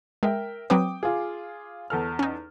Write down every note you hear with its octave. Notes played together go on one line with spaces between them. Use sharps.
G#3 A#4 E5 G5
F#3 C4 B4 G5 D6 D#6
F4 G#4
E2 A4 F6
C#4 D#4